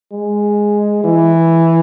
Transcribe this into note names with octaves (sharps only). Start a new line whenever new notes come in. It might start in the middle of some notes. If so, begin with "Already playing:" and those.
G#3
E3